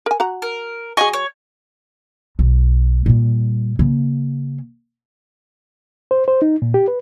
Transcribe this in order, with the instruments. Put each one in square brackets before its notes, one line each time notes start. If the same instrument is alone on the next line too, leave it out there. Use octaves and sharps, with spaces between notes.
[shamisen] A#4 G#5
F#4 F#5 A#5
[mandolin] A#4
[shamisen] F#3 G#4 [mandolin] D#5 G#5 C#6
[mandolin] C#5
[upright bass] B1
A#2 G3
C#3 A#3
[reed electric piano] C5
C5
D#4
A#2
G4
B4